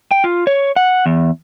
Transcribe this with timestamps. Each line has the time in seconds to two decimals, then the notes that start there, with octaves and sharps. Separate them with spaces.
0.11 G5
0.24 F4
0.47 C#5
0.76 F#5
1.06 E2